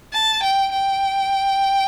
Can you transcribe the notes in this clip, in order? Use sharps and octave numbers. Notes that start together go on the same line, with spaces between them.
A5
G5
G5